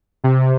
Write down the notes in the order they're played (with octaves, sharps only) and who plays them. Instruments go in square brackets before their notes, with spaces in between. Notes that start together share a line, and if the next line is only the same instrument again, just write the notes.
[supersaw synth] C3